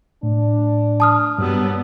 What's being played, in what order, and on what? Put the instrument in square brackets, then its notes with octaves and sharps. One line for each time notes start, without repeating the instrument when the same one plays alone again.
[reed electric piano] A2 [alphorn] D4
[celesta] A5 D#6 F6
[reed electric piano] G2 E6 [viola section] F#3 G3 B3